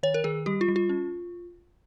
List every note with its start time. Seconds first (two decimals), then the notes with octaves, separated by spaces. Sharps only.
0.03 D#3 C#5
0.14 A#4
0.24 D#3 G#4
0.46 G3 G4
0.61 F4
0.68 G3
0.76 F4
0.89 C#4